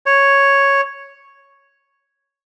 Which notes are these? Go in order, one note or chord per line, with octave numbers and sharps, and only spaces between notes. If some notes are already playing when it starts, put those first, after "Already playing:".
C#5